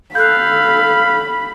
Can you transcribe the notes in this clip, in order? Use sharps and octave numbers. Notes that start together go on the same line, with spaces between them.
A4 F5 B5 F#6 G6